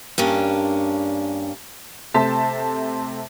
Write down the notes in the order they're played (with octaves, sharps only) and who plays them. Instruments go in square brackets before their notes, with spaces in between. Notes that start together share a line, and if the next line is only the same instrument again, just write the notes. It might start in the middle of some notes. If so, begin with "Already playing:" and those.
[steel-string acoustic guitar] G2 A#3 C#4 D4
[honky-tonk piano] C3 A3 C5 A5 B6